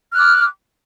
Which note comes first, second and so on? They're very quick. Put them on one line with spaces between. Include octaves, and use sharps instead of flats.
F6 F#6 D6